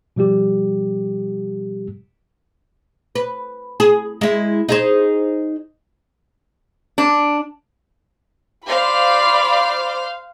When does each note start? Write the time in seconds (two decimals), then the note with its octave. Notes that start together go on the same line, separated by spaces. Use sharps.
0.16 B2 F3 G3 G4
3.15 B4
3.80 G#4
4.21 G#3 E4
4.69 D#4 G#4 C5
6.98 D4
8.67 C5 D5 F5 B5